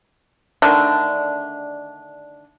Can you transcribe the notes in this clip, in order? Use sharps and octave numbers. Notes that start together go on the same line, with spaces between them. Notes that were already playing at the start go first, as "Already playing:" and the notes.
D3 D#3 A3 D4